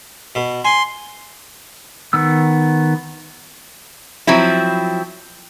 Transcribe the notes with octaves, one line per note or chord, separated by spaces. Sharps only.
B2
G#5 C6
D#3 B3 E6
F3 F#3 C4 E4